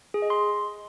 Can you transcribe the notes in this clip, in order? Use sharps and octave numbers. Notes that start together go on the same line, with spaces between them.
G#4
D#5
C6